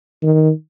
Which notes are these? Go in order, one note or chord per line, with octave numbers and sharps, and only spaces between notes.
D#3